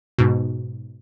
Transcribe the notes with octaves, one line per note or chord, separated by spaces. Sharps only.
G#2 B2